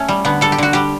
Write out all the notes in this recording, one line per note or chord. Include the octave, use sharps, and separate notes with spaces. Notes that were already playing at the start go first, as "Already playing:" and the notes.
Already playing: A3 C#4
G3
D3 B3
G3 A4
G4
D3 F#4
G3 G4